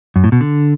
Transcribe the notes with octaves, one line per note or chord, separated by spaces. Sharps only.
F#2
A2
B2
D3